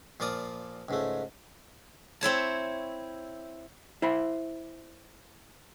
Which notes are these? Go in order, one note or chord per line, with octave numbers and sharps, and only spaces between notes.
A#2 F3 F4 D5 D#6
C#2 G#2 A3
C4 E4 C#5 A5
E4 C5 B5